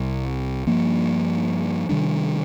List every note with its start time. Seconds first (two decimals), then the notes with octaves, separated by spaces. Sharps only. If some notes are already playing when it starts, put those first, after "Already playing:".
Already playing: C2 C3 G3
0.67 G2 F3 A#3
1.89 C3 D#3 G3 D4